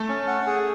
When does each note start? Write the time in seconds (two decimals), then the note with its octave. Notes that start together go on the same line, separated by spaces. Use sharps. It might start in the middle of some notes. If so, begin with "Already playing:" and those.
Already playing: A3 A4
0.08 C#4
0.28 F#5
0.47 G#4